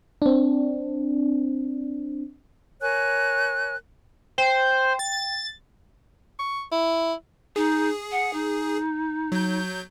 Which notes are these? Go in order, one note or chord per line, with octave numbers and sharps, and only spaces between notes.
C4 D4
A#4 C#5 G#5 F#6
C5 G5
A6
C#6
E4
D#4 G#4
F#5
D#4
F#3 G6